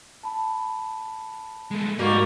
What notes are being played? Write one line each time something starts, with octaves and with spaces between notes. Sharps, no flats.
A5 B5
G#3 A3
G#2 B2 G3 A#3 F#4